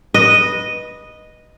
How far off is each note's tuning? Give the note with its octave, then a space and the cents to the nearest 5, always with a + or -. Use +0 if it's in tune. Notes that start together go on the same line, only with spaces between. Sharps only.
B4 -15 D#5 -5